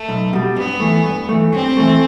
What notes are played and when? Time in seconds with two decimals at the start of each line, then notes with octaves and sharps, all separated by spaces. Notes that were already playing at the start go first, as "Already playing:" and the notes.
Already playing: A3
0.09 B1
0.33 B2 G3
0.56 G2 B3
0.80 E3 A3
1.05 G2
1.29 E3 A3
1.52 G2 C4
1.77 E3 A3